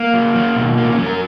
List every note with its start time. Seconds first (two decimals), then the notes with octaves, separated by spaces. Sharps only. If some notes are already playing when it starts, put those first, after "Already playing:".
Already playing: A#3
0.14 F#3
0.36 F#3
0.56 B2
0.77 F#3 A#3
0.92 C#4
0.99 F#3
1.06 A#4